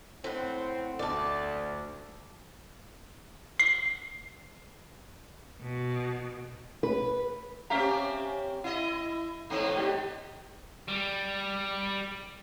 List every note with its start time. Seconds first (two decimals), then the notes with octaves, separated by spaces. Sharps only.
0.24 A2 C4 F#5
0.99 D2 D5 A5
3.59 C7
5.62 B2
6.83 B4
7.70 C4 C#4 G4 E5 F5 A#5
8.64 E4 D#5
9.50 E2 G#2 D#4
9.77 G4 D5 D#5
10.88 G3